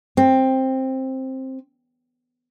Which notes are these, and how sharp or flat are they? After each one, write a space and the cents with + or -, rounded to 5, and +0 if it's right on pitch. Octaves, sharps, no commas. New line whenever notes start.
C4 +10